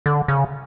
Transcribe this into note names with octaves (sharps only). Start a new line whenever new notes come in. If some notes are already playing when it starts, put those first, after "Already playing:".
D3
C#3